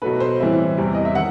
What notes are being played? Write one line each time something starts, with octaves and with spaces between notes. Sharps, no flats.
B2 F#3 A3 B4
C5
A2 E3 G3 C4 E4
E2 C3 E3 G3
D#5
E5
D#3 F#5